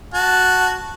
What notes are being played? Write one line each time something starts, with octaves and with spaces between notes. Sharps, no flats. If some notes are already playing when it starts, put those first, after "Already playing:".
F#4 A5